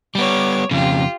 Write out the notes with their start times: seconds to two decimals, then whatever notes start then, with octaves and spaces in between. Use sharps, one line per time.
0.15 G3 B3 C#5 D6
0.71 F2 C#3 F4 G4